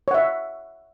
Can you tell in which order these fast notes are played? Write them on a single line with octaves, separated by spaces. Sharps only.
C#5 F#5 E5